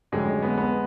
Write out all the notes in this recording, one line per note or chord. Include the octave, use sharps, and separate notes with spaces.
F2 D3 F#3 G#3 A3 C#4
B3
B3